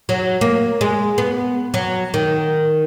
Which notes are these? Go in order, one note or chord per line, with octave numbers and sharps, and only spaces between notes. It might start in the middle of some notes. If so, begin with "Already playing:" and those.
F#3
A#3
G#3
B3
F#3
D#3